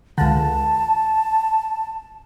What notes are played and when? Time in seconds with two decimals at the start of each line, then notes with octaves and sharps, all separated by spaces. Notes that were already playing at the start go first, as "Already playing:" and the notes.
0.18 C#2 D3 A5